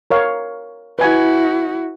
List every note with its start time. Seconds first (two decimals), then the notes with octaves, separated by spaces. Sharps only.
0.11 A#4 C#5 F5
0.99 E4 F#4 B4 G#5